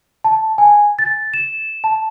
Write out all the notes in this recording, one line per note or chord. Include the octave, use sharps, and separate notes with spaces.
A5
G#5
A6
E7
A5